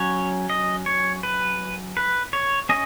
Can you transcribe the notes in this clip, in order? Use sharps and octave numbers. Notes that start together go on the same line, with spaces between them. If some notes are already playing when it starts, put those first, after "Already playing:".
Already playing: F#3 C#4 C#5
D#5
C#5
B4
B4
C#5
C#4 D#5